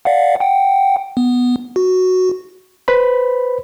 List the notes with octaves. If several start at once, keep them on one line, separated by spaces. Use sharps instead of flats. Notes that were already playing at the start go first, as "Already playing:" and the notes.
D5 F5 F#5
F#5 G5
B3
F#4
B4 C5 B5